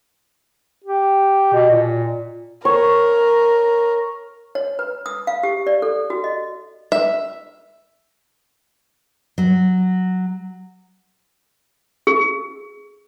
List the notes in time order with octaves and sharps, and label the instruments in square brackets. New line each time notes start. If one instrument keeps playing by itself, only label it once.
[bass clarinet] G4
B2
A#2
[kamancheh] A#4 [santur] C#5
[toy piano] C#5
B4
D#6
F5
G4
D5
A4
F#4
D#5
[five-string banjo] E5
[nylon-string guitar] F#3
[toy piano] G#4